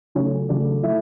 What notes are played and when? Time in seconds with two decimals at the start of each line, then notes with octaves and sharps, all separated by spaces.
0.15 C#3 F#3 A3 C#4 C#5
0.49 C#3 F#3 A3 D4 D5
0.83 F#3 A3 E4 E5